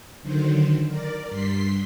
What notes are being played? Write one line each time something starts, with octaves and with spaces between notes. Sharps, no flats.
D3 D#3 F#3 C5
A#4 D5
G2 C6 B6 C7